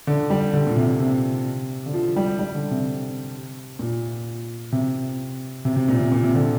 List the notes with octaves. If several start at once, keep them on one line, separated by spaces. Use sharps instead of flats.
D3
G3
D3
A#2
C3
C3
D3
F3
G3
G3
D3
C3
A#2
C3
C3
C3
A#2
C3
A#2
C3
D3